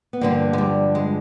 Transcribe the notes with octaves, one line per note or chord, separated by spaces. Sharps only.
B3
G2 D3 F3 A#3
G#3
G3
G#3